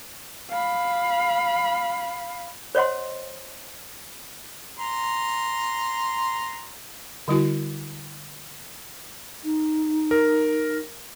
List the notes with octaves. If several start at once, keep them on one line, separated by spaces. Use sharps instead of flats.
F5 B5
C5 C#5 D#5 F#5 C6
A#5 C6
D3 G3 E4 F#4
D#4
A#4